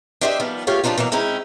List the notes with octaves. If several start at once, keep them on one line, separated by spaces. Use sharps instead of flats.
D4 E4 G4 C5 D#5 E5
D#3 F3 G3 B3
A3 F4 G4 C#5 F5
F3 G3 A3 D4 D#4 F4
B2 E3 F#3 A#3
G#3 C4 C#4 D#4 E4